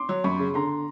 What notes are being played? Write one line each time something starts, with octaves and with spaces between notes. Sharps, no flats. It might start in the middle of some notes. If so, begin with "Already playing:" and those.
Already playing: C6 D6
F#3
F#2 B5 C#6
C#3
D3 A#5 C6